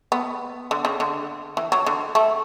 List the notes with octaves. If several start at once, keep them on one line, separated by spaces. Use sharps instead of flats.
B3
D3
C#3
D3
E3
F#3
D3
A3